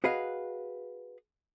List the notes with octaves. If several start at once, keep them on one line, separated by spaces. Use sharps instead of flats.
F#4 G#4 B4 D#5 F5